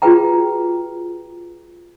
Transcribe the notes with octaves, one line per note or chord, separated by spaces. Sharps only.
F4 F#4 G#4 B4 G5 A#5